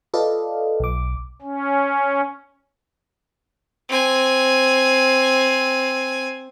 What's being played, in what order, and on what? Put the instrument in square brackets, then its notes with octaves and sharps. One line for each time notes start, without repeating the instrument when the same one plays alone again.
[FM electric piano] F4 A4 B4 D5 D#5 F5
B1 D6
[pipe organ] C#4
[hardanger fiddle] C4 G#5